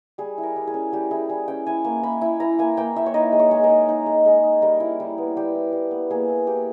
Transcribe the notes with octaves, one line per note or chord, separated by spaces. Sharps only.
G3 G#4
E4
A#4
G3
G#4
C#4
G3 G4
E4 G#4
G3 G#4
C#4 G5
E4 G#5
A#3
A#3 B5
E4
E4 A#5
A#3 G#5
A#3 G5
E4 E5
C#5
D#4 D#5
G#3
C#5
G#3
A#4
D#4
D#4
G#3
G#3
D#4
G3 A#4
E4
G3
B3
G3 G4
E4
G3
B3
A#3 G#4
E4
A#3 G4